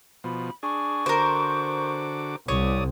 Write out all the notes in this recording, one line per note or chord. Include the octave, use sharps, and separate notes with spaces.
B2 F3 B5
D4 G#4 C#6
D3 F#4 A#4 C5 D6
C2 G4 C#5 D5 D#6